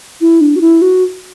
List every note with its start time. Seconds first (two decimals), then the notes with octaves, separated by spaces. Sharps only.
0.21 E4
0.41 D4
0.56 F#4
0.61 E4
0.82 F#4